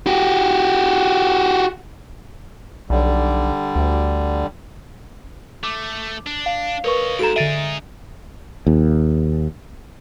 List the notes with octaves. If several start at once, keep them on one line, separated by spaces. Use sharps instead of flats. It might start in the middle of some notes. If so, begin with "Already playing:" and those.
F#4 G4
B1 D3 G3
D2
A3 D6
D4
F5
A#4 B4 C#5 D#5 C#6
G#2 F#4 A4 A#5 D7 E7
D3 D#4 G#4 E5 A6 D7 D#7
D#2